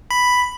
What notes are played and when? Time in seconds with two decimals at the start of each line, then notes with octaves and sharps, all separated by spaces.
0.11 B5